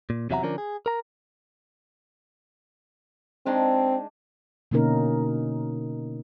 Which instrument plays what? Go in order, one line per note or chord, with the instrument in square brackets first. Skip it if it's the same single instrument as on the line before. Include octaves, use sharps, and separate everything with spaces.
[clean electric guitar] A#2
E2 C3 F#3 E5 F#5 A#5
D3 F3 C#4 D4 A#4
G#4
A#4 A#5
[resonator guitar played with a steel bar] G#3 D4 D#4 [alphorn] C4
[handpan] B2 D3 A#3 C#4 D#4 A#4